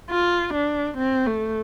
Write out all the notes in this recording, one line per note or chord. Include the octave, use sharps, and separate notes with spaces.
F4
D4
C4
A3